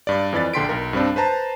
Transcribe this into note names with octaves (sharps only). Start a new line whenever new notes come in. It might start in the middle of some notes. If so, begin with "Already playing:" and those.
G2 D5
F2 E3 B4 D5 A6
A#1 D3 G5 C6 B6 D7
B1 A#4
G2 C4 D4
B4 C5 A5 A#5